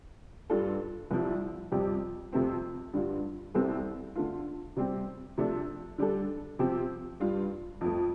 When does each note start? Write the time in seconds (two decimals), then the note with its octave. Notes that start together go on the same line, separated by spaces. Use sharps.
0.50 G2 G3 D4 F4 A4
1.11 C2 C3 F3
1.71 F2 C3 G3 C4 G4
2.33 F2 C3 A3 C4
2.93 G2 D3 G3 F4
3.54 C2 C3 G3 C4 A4
4.15 D3 A3 F4
4.76 C3 G3 C4 G4
5.38 C3 F3 A3 D4
5.98 D3 G3 D4 A4
6.59 C3 F3 C4 G4
7.20 G2 G3 F4
7.81 F2 F3 A3